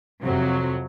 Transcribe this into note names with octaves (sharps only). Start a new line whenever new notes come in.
F2 C3 F#3